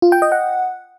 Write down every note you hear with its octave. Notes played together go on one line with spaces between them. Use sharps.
F4
G5
D#5
F#5